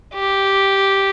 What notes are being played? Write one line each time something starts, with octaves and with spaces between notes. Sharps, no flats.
G4